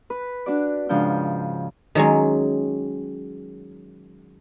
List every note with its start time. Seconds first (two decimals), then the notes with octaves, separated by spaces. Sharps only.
0.10 B4
0.46 D4 F#4 D5
0.89 G#2 C#3 F3 D4 G5 F6
1.95 D#3 F#3 G#3 C#4